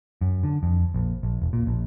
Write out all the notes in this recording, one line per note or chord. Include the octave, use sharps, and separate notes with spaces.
F#2
D3
F2
A#1
A#1
E1
A#2
A#1